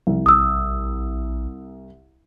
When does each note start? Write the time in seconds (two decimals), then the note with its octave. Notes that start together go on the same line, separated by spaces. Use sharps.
0.07 C2 F3
0.26 A#1 D#6 E6